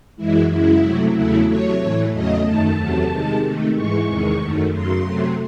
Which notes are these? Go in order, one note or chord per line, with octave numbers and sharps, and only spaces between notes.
F#2 E3 G#3 E4
F#2 C#3 G#3 E4
C3 F#3 A3
E2 C#3 F#3 A3 E4
C3 F#3 A3 C#5
A2 E3 A3
E2 C#3 F#3 A3 D#5
F#2 D#3 A3 A5
E2 C3 F#3 A3
C3 D#3 G#3
C3 D#3 A3
G#2 E3 G#3 C#6
E2 C3 D#3 G#3
F#2 D#3 A3
F#2 C#3 F#3 C6
C3 F#3 A3